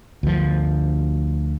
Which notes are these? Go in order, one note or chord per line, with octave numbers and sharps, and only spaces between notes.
D2 F3